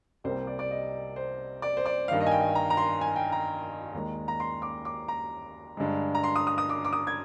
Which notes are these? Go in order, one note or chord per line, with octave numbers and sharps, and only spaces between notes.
C2 C3 G3 A#3 C5
D5
D5
D#5
C5
D5
C5
D5
G2 D#3 A#3 F5
D#5
G#5
G5
A#5
A#5
C6
G#5
G5
A#5
D#2 D#3 G#3
A#5
C6
D6
D6
A#5
G2 D3 G#3
A#5
C6
D#6
D#6
D#6
D6
D6
D#6
G#6